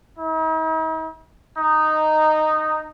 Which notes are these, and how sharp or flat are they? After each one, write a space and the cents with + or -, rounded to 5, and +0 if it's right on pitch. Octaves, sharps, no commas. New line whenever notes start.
D#4 +45
D#4 -10